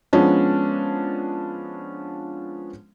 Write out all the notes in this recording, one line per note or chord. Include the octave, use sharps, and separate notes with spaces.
F3 G#3 B3 C#4 D4